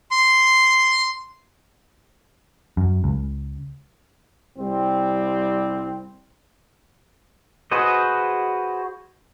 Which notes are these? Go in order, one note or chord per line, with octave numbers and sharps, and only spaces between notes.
C6
F#2
C#2
C2 G3 C4
F#4 G#4 B4 C5 D#5